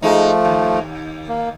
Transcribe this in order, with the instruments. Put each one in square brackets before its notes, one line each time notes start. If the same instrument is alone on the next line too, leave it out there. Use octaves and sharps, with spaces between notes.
[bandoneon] F3 A3 [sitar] G#3 D#4
[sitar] D#2
[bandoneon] A#3